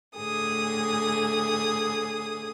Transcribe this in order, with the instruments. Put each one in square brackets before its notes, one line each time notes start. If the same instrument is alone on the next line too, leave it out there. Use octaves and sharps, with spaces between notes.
[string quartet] A2 D3 G#4 D#6